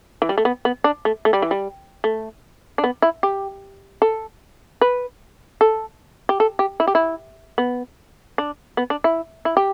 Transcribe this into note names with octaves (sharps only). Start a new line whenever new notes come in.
E3
G3
A3
B3
B3
D4
A3
A3
G3
E3
G3
A3
D4
B3
E4
G4
A4
B4
A4
G4
A4
G4
E4
G4
E4
B3
D4
B3
D4
E4
E4
G4